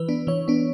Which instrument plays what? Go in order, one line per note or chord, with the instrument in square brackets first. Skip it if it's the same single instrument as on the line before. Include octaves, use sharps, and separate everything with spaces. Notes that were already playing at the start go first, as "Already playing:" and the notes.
Already playing: [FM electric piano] E3 B4
B3 D4
E3 C#5
B3 D4